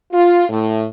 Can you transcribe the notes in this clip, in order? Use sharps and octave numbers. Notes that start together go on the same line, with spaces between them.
F4
A2